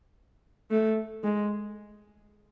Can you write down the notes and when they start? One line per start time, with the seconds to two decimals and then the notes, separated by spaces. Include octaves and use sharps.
0.71 A3
1.24 G#3